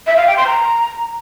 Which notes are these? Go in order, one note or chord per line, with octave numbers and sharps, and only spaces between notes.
E5
F5
G5
C6
A#5